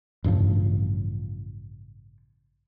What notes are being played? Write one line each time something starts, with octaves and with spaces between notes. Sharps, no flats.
A1 G2 C#3 F3